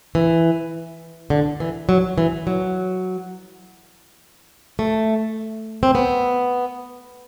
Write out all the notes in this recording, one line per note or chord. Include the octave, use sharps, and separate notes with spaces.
E3
D3
E3
F#3
E3
F#3
A3
C4
B3